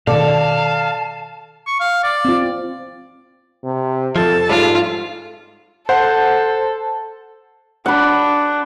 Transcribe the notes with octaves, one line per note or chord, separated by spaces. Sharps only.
B2 D#3 A4 D5 F5 A5
C#6
F5
D5
C4 F4
C3
F2 F3 A4 A5
G#2 G3 G#3 F4
A4 C5 F#5
D4 F#5 B5